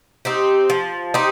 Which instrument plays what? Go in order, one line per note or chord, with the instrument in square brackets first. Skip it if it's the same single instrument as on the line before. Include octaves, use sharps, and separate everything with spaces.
[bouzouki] C4 D#4 G4
F3
C4 D#4 G4